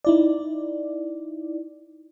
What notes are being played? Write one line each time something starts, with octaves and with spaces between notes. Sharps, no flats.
D#4 E4 D5